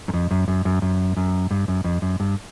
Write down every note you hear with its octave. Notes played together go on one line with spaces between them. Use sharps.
F#2
F2
F#2
F#2
F#2
F#2
F#2
G2
F#2
F2
F#2
G2